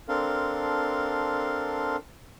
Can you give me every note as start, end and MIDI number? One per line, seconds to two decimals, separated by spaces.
0.08 1.96 60
0.08 1.96 62
0.08 1.96 69
0.08 1.96 70
0.08 1.96 77
0.08 1.96 84